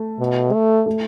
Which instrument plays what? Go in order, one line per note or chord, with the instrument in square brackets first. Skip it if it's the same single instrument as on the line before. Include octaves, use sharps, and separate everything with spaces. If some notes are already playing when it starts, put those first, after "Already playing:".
Already playing: [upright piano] A3
[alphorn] B2
A3
[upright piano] A3